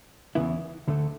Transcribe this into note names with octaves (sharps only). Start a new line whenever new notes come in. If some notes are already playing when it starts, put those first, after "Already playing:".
E2 C#3 E3 B3 E4
D2 D3 A3